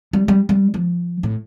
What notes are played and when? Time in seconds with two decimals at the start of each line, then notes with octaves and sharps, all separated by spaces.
0.13 G3
0.28 G3
0.49 G3
0.74 F3
1.23 A2